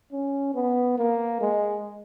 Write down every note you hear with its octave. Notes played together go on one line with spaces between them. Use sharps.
C#4
B3
A#3
G#3